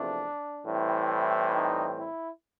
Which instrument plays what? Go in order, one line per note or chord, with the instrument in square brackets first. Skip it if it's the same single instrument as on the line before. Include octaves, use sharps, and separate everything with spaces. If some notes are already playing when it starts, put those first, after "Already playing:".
Already playing: [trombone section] E2 C3 F3 A3 C4 D4
A2 E3 G3 C4
D#4
E4